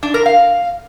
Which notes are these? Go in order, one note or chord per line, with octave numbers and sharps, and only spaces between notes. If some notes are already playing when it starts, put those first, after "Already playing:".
D4
A#4
F5